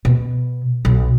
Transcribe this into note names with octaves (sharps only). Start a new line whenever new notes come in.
B2
B1